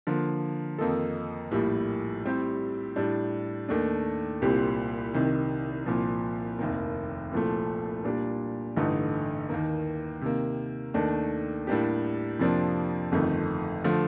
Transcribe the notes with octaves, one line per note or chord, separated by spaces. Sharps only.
D3 F3 A#3
F2 D#3 A#3 D#4 A4
A#1 A2 G3 A#3
A2 G3 C4 G4
A2 G3 D4
D#2 D#3 A3 D4
C2 A#2 G3 C4 G4
C2 C3 D#3
C2 A#2 F3
F1 D#2 D#3 A#3
C2 A#2 F3 A3
A#2 G3 D4
A1 G2 D3 A3 D#4
D#2 D#3 A#3
C3 D#3 A#3
D#2 D#3 A3 D4
A2 G3 A#3 D4 G4
F2 C3 F3 A#3 D4
G1 F2 D#3 A3
D3 F3 A3